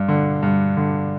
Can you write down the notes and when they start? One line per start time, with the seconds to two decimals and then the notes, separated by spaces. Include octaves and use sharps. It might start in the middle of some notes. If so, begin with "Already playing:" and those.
Already playing: G2
0.08 D3
0.42 G2
0.77 D3